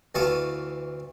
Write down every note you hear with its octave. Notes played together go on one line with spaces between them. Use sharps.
D2 E3 F4 A5 C#6 D#6